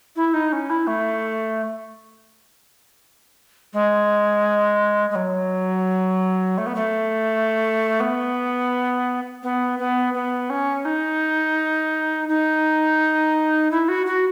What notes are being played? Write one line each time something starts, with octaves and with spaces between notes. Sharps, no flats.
E4
D#4
C#4
E4
A3
G#3
G#3
F#3
A3
B3
A3
B3
B3
B3
B3
C#4
D#4
D#4
E4
F#4
F#4